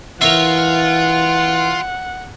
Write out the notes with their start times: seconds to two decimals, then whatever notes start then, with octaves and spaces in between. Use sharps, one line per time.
0.21 E3 F4 A#4 C#5 E5 F#5